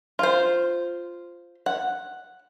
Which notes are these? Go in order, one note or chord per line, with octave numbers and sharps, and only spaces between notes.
F4 C5
F#5